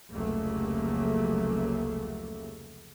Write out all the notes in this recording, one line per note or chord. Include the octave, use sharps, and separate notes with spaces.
F1 C#2 C#3 F#3 A3 A#3